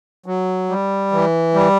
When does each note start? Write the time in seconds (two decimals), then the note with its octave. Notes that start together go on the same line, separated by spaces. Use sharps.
0.26 F#3
0.69 G3
1.12 E3
1.54 G3